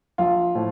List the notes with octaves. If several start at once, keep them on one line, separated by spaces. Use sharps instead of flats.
A#1 F4
A2 F3